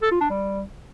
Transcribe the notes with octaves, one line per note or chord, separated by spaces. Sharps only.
A4
F4
D4
G3